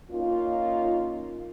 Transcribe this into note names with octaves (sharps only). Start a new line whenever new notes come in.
A#3 C#4 D#4 F4